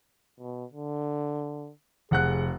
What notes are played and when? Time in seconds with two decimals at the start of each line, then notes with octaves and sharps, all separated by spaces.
0.40 B2
0.73 D3
2.11 F1 G#4 F#5 F#6